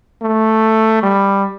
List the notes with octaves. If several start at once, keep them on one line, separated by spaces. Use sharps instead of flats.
A3
G3